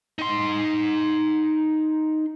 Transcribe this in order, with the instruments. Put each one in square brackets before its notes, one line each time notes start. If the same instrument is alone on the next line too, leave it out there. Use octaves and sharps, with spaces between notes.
[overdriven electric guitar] D#4 C6